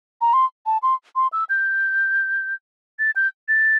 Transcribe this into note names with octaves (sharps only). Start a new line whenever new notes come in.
A#5
C6
A5
C6
C6
E6
G6
A6
G6
A6